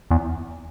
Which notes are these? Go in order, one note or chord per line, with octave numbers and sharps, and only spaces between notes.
E2